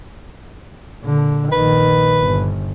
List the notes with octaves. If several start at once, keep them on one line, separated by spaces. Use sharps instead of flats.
A#2 D3
A#1 D#3 B4
G1